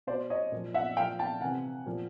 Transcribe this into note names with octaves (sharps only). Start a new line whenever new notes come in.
B2 C5 D5
C#5 D#5
A#2 F3
E5 F#5
A#2 F3 F5 G5
G5 A5
C3 E3 F#5 G#5
A#2 F3